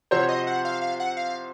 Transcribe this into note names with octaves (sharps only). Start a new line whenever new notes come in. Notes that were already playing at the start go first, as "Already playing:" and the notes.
C3 F3 C4 F#4 C5 C#5
D#5
F#5
F5
F5
F#5
F5